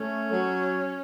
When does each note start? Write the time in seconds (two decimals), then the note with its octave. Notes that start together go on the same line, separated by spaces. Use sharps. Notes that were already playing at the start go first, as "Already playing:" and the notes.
Already playing: A3 C#4
0.31 F#3